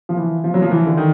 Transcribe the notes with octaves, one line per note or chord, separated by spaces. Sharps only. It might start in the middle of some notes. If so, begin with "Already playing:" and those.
F3
E3
F3
F#3
F3
E3
D3
D#3